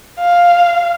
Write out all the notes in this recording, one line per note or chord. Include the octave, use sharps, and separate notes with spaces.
F5